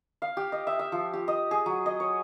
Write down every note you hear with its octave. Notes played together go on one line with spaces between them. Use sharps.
F5
G4
D#5
E5
E5
F3
G4
D#5
G#4
F#3
D#5
C#5